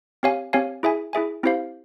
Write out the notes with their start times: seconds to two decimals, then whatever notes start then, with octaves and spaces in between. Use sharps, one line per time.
0.23 C4 G4 C#5 F5 G#5
0.53 C4 G4 C#5 F5 G#5
0.83 E4 G#4 E5 G#5
1.13 E4 G#4 E5 G#5
1.43 C4 E4 G4 C5 F5